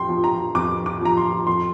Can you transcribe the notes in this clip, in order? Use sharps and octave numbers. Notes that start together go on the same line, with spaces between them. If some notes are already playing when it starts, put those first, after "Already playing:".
Already playing: F2 G5 C6
F3
A#5
F2 D6
D6
F3 A#5
C6
F2 C6